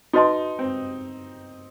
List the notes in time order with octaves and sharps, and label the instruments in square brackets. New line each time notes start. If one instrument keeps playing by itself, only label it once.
[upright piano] D#4 [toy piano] F#4 B4 D#5 A5 C6
[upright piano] C4